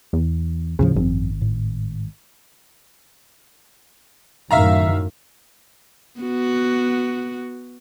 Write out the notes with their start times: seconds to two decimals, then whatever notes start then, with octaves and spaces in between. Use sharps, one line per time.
0.13 E2
0.79 D#2 A2 C#3 F3
0.96 G#1 F#2 F3 C4
1.41 A2
4.51 F#2 A2 D#3 E5 F5 A#5
6.20 B3 F#4